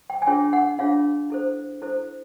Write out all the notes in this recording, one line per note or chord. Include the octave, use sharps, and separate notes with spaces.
G5
G#5
D4 F4 G#4 C#5 G5
F#5
D4 F4 G#4 C#5 F5
E4 A4 C5
E4 A4 C5